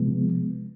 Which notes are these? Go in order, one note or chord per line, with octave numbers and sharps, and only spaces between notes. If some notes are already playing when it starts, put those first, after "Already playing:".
Already playing: C3 F3 G#3 B3